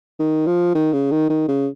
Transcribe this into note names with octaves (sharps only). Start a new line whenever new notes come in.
D#3
F3
D#3
C#3
D#3
D#3
C#3